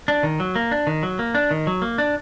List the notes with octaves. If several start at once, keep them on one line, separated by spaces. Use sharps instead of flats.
D4
D#3
F#3
A#3
D4
D#3
F#3
A#3
D4
D#3
F#3
A#3
D4